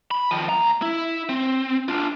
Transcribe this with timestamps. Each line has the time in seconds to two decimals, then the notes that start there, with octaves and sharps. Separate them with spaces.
0.11 B5
0.31 D#3 F3
0.49 D#2 A#5
0.82 E4
1.29 C4
1.88 D4 F4